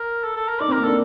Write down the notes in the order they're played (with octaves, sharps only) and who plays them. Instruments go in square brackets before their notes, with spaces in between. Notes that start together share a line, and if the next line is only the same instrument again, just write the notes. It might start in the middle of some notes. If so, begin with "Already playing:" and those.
Already playing: [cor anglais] A#4
A4
A4
A#4
[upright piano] D#4 [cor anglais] D5
[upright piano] C4
[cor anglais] A#4
[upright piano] A#3
[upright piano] D4 [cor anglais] A4